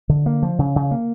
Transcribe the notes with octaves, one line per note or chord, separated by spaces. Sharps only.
D3
A#3
F3
C#3
C#3
A#3